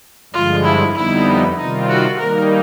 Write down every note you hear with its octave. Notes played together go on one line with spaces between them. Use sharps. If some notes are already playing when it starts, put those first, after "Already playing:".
G2 D3 F3 G#3 F4
E4
F2 D3 G3 B3 D#4 E4
C3 D#3 G3 C4 D#4 F4
F#4
D#3 G3 A#3 D#4 A#4